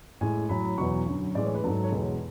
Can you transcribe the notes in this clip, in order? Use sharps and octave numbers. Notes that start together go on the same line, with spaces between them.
A2 G#3 G#5
A2 F#3 B5
E2 B2 F#3 C#6
F#2 D3 F#3
A2 E3 G#3 D5
C#5
B4
G#2 F#3 A4
C#5
E2 B2 G#3 B4